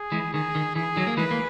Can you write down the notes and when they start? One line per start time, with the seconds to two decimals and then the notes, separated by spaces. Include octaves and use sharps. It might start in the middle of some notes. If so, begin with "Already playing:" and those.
Already playing: G#4
0.12 E3 G#3
0.34 D#3 G#4
0.55 D#3
0.75 E3 G#4
0.96 D#3 F#3
1.07 A#3
1.17 E3 G#3 B4
1.31 A#3